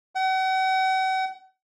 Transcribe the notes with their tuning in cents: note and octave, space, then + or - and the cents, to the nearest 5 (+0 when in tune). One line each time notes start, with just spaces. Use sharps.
F#5 +40